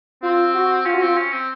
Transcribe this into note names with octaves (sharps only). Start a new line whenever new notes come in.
C4 F4
F#4
C#4 F4
F#4
C4 F4
C#4
C4